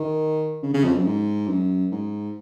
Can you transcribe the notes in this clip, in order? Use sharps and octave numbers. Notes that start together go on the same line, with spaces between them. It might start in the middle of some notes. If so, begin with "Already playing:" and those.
Already playing: D#3
C#3
C#3
F2
F#2
G#2
F#2
G#2